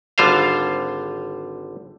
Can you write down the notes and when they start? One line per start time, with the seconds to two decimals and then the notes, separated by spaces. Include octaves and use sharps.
0.18 G#1 D3 G3 F4 C5 F5